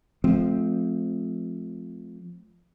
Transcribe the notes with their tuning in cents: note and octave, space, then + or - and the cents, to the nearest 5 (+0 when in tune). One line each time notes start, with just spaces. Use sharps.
F3 +0 A3 -35 C4 -5